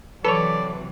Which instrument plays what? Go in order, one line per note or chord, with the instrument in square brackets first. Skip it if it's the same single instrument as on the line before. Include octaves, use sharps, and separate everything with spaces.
[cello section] C3 E3 F#3 [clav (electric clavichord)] A4 C#5 [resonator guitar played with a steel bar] B4 [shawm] D5